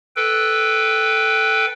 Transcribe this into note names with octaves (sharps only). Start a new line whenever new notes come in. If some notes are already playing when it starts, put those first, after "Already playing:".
A4 B4 G5